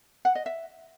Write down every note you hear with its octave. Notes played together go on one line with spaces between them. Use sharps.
F#5
D#5
E5